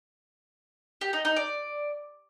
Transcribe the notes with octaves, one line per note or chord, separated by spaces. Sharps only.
G4
D#4
D#4
D5